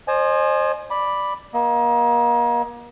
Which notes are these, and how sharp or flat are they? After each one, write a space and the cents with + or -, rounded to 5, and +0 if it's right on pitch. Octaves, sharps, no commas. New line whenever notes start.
C5 +25 D#5 -40 G#5 +25
D5 +0 B5 +0 D6 +0
A#3 +35 D#5 +25